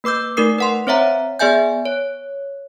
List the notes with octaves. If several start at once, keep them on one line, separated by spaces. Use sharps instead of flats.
A#3 B4 D6 E6 G6
A3 D#4 A#4 D#6 C7
B4 F#5 C6
C4 C5 C#5 E5 F#5 A#5
B3 G#4 D5 E5 G#5 G6
C#5